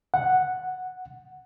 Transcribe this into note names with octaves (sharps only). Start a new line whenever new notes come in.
F#5